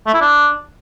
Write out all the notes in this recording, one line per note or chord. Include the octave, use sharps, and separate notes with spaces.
A3
E4
D4